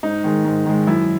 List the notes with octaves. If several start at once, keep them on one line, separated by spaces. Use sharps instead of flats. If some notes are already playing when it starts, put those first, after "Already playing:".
G#2 D#4
D#3 G#3
G#2
D#3 G#3
F#2 E4